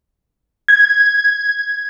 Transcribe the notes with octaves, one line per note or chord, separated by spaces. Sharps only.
G#6